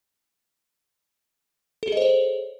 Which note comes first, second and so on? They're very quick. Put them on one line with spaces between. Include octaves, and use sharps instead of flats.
A4 G#4 D#5 C5 C#5